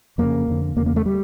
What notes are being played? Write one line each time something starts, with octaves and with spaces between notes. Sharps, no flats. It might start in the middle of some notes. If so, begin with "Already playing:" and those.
F2 C#3 A#3
F2 D3
E2 C#3 A#3
A#3
A3
G3